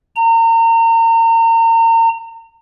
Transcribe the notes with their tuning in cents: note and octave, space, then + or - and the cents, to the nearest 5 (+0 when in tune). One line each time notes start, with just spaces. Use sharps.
A#5 -35